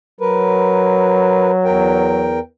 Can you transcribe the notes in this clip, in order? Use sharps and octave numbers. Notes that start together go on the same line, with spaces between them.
F#3 A#4 B4
E2 A#4 G5